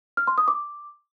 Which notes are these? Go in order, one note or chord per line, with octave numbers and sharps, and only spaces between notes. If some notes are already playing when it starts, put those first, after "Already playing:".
F6
C6
D#6
D6